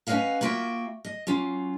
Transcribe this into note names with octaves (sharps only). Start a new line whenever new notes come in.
C#4 B4 C#5 D#5 F5 F#5
A#3 F4 F#4 E5 G5
D#5
F#3 C#4 F4